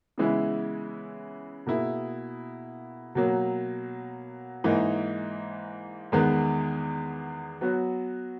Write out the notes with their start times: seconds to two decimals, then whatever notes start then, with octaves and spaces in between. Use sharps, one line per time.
0.18 C#3 E3 G#3 B3 E4
1.66 B2 A#3 E4 G#4
3.15 B2 F#3 A#3
4.64 G#2 E3 A#3 D#4
6.12 E2 D#3 G#3 B3
7.61 F#3 B3 F#4